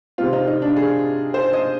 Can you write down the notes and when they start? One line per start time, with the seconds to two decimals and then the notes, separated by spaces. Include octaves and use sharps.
0.18 C3 D#3 G#3 C4 F4
0.33 D#4
0.48 D#4
0.62 D4
0.77 G#4
1.34 C5
1.53 D#5